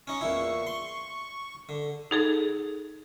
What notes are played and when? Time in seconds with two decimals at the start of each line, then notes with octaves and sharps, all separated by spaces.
0.07 C#4 D#4 C#6
0.21 E2 A#2 E4
0.67 C6
1.69 D3
2.11 D#4 G#4 A4